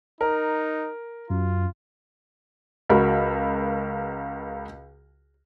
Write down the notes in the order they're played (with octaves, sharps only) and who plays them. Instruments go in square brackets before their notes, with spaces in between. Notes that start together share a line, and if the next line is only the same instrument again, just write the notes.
[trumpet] D#4 [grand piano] A#4
[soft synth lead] F#2 [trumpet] F4
[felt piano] C#2 F#4 A#4 B5